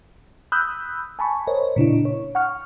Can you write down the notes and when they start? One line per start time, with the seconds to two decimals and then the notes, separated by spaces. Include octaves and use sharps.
0.52 B5 D#6 E6 F#6 G6
1.19 G#5 A5 B5 C#6
1.47 A#4 C5 C#5 D#5
1.76 A#2 C#3 D4 E4
2.05 C#5
2.35 F#5 C#6 F6